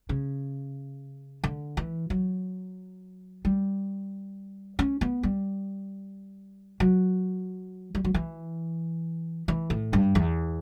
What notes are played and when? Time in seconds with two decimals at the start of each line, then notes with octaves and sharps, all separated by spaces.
0.09 C#3
1.44 D3
1.77 E3
2.10 F#3
3.45 G3
4.79 C#4
5.01 B3
5.23 G3
6.80 F#3
7.95 G3
8.04 F#3
8.14 E3
9.48 E3
9.70 A2
9.93 G2
10.15 E2